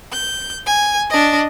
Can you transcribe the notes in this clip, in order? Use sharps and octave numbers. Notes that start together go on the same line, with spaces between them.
G6
G#5
D4 D#5